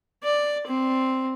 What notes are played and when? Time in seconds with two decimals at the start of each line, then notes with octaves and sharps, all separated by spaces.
0.23 D5
0.67 C4